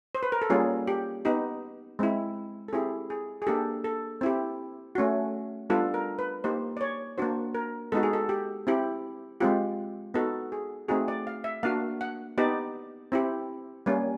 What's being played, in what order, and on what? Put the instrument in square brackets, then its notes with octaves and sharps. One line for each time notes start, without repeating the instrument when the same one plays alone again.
[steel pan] C5
B4
A#4
A4
G3 A#3 C#4 F4 G#4
G4
B3 D#4 G4
G#3 C4 E4
A4
C4 E4 G4 G#4
G#4
G#4
A#3 D4 G4 A4
A4
C4 E4 G4
A3 C#4 F#4
G3 B3 D4 F4 A4
A#4
B4
A#3 D#4 G4 C5
D5
C#5
A#3 D4 F#4 C5
A#4
G#3 B3 D#4 F#4 A4
G#4
A4
G4
C4 E4 G4
G#3 C4 F4 G4
B3 D#4 F#4 A4
G#4
A3 C4 D#4 F#4 G#4
D5
F5
E5
A#3 D4 F#4 F5
F#5
B3 D#4 G4 D5
C4 E4 G4
G3 A#3 C#4